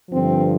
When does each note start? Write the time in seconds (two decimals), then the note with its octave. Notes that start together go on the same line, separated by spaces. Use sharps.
0.11 G2 D3 F3 C4